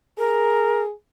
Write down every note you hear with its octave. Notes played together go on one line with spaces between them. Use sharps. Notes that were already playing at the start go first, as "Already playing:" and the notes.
G#4 A#4